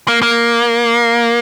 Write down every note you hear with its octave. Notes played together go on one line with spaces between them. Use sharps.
A#3
A#3